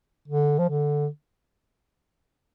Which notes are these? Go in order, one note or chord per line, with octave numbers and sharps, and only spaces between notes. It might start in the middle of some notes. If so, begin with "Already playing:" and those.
D3
F3
D3